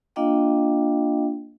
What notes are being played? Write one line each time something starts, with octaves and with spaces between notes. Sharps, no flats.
A#3 D4 F4 D#5 F5 G5